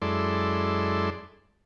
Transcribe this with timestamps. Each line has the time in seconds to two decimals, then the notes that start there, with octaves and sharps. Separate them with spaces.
0.02 F#2 G#3 E4 A4 D5 C6